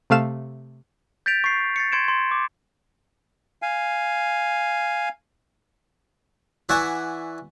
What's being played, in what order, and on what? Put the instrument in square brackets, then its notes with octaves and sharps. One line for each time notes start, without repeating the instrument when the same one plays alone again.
[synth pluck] C3 A3 F5 E7
[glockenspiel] G6 A6 B6 D7 F7
C#6 C7
A6 C7 C#7
C6 G#6 C#7 D7 E7
C6 G#6
D6
[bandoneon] F5 G#5
[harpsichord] E3 D5 E5 F#5 G#5 C#6